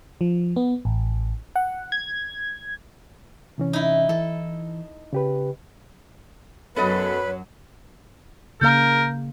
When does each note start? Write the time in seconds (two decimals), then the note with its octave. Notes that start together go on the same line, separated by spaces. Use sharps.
0.21 F3
0.56 B3
0.85 A1
1.56 F#5
1.92 G#6
3.58 C3 E3 C#4
3.73 D#4 E4
4.09 E3 A4
5.13 C#3 G4 B4
6.76 F#2 F#3 B3 A4 B4 C#5 D#5 B5
8.61 C#3 A#3 A#4 F5 A#5 G6